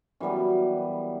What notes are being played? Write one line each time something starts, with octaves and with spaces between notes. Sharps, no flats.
F#2 E3 G3 B3